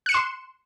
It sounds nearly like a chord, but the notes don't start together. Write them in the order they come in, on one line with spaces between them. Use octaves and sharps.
F#6 C#7 E7 C6